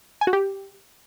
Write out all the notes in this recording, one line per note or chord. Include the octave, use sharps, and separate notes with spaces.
G#5
F#4
G4